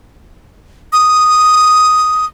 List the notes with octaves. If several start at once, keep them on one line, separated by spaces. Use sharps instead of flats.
D#6